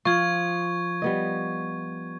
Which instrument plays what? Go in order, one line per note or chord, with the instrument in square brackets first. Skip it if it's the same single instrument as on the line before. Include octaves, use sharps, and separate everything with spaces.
[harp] F3 [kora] F4 [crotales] C#6 G#6
[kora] G3 B3 D#5